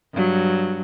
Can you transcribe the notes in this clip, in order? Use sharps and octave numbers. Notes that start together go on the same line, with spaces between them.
G2 F#3